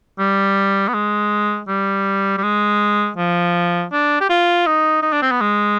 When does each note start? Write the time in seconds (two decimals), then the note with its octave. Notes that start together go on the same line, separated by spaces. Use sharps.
0.19 G3
0.89 B3
0.94 G#3
1.68 G3
2.38 G3
2.43 G#3
3.17 F3
3.92 D4
4.21 G4
4.30 F4
4.67 D#4
5.03 D#4
5.12 D4
5.22 C4
5.31 B3
5.41 G#3